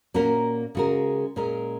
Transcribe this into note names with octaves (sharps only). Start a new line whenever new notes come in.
A#2 A#3 C#4 F#4 A#4
C#3 G#3 F#4 A#4
A#2 G#3 C#4 A#4